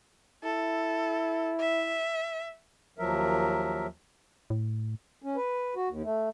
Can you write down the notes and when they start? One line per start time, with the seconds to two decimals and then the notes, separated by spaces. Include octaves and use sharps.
0.44 E4 A4
1.60 E5
2.99 D#2 F3 F#3 A#4 E5
4.50 A2
5.23 C#4
5.36 B4
5.76 F#4
5.89 D#2
6.04 A3